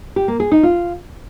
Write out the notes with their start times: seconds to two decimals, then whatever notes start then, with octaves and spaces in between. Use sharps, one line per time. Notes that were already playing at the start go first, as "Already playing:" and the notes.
0.16 G4
0.28 A#3
0.40 G#4
0.51 D#4
0.63 F4